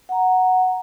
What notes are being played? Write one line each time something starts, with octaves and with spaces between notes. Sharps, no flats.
F#5 A#5